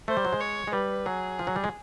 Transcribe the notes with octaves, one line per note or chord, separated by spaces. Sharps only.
A3 C5
G3
F#3
G#3
C#5
G#3
G3 B4
F#3 G#4
F3
F#3
G3
G#3